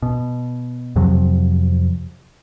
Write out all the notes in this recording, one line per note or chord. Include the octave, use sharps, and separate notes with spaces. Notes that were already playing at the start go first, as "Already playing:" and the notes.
B2
F2 C3 F3 F#3